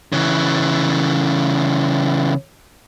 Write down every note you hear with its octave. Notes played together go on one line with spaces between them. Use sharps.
C#3 E3